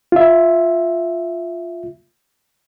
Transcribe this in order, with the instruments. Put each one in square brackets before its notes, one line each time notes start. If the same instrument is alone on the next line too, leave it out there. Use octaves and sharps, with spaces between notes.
[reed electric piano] F4 E5